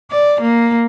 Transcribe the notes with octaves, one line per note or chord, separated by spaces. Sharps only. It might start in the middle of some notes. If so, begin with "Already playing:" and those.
D5
A#3